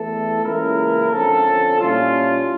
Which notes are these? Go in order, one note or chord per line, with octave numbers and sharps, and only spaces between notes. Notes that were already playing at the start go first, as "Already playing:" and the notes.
Already playing: E2 E3 A3 E4 A4
C#2 C#3 E3 A#3 E4 A#4
F2 D3 F3 C#4 A4
A#2 G3 C#4 E4 F4